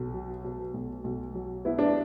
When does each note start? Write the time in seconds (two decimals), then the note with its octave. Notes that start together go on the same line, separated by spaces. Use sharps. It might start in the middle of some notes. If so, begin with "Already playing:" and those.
Already playing: B1 B2
0.14 F#3
0.44 B2
0.74 B1
1.04 B1
1.35 F#3
1.65 B3 E4
1.78 D4